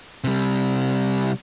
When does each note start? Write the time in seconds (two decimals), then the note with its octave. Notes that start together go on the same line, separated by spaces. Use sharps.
0.24 C3 G3